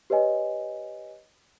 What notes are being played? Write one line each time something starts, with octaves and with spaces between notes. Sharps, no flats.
G4 B4 C#5 D#5 G#5